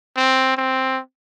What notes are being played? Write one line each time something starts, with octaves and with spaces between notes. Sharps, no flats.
C4
C4